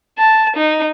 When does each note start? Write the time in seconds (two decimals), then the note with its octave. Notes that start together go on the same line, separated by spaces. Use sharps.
0.19 A5
0.57 D#4